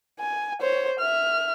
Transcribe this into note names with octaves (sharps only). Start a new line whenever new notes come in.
G#5
C5 C#5
E5 F6